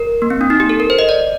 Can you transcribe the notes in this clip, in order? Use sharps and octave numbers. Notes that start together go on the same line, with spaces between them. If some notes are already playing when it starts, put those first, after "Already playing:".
Already playing: A#4
A#3
C4
D4
D#4
G4
A4
A#4
C5
D#5
D5